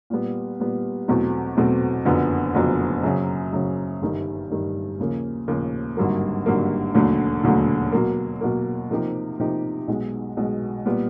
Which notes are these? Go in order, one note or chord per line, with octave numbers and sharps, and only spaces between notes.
A#2 G3 B3
A#2 G3 B3
E2 B2 F#3 A3 C4
E2 B2 F#3 A3 C4
F#1 F2 D3 F#3 B3
F#1 F2 D3 F#3 B3
F#2 C#3 F#3
F#2 C#3 F#3
G1 G2 D#3 G3
G1 G2 D#3 G3
D#2 C#3 F3 A#3
D#2 C#3 F3 A#3
G#1 G2 D3 F#3 A#3
G#1 G2 D3 F#3 A#3
E1 D#2 D3 F#3 A3
E1 D#2 D3 F#3 A3
B2 F#3 A#3
B2 F#3 A#3
C3 F3 A#3 D#4 G4
C3 F3 A#3 D#4 G4
B1 B2 G#3
B1 B2 G#3
A#2 G3 B3